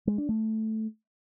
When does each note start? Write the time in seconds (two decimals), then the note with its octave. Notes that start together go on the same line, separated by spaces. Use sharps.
0.07 G#3
0.18 D4
0.29 A3